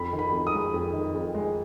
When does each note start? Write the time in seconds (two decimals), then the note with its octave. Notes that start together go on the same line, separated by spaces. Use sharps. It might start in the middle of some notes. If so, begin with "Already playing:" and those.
Already playing: F2 B5
0.13 D#3
0.19 B5
0.32 F2
0.47 D#6
0.53 G#3
0.74 F2
0.93 D#3
1.14 F2
1.35 G#3